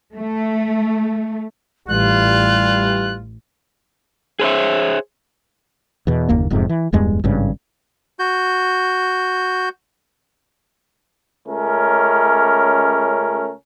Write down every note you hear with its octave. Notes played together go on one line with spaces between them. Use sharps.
A3
A1 E3 G3 F4 F#6
G#4 C5 C#5 E5
E2 B2
F#1 D#2 A#3
E1 F2 G#2 C3
E3
D1 E2 G2 G#3
G#1 G2 C#3
F#4 G6
C#2 A3 C#4 A#4